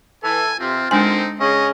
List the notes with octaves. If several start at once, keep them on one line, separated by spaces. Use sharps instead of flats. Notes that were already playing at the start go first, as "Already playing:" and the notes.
E3 A4 G#5
C3 C4 F4
D3 D#3 G#3 C4 D4 D#4 G#5
C#3 C#4 D#5